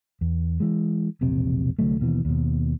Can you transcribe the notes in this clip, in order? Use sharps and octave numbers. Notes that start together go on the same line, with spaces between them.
E2
E3 G#3
E1 A#1 C3 C4
C2 D3 F#3 A3
D#2 B2 E3
D#2 B2